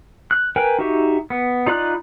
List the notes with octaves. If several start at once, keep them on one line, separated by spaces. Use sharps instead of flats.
F#6
A#4 B4 G5 G#5
D#4 F#4 G4 E5
B3
D#4 F4 D5 B5 F#6